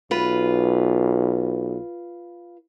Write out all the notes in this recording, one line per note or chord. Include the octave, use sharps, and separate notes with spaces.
B1 F4 B4